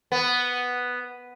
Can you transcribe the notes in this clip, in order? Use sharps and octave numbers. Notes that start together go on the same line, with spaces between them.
B3